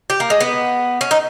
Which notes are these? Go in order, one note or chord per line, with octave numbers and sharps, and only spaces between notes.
G4
A#3
G#3
B3
C#4
D#4